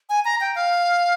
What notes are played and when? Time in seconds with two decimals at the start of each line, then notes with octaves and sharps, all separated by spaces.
0.09 G#5
0.25 A#5
0.41 G5
0.55 F5